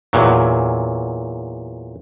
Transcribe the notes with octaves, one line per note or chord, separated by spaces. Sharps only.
E2 A#2 F#3